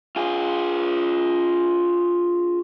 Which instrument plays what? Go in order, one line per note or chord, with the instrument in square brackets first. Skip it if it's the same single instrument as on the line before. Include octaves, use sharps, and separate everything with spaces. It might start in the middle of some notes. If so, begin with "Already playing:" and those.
[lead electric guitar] F4 G#4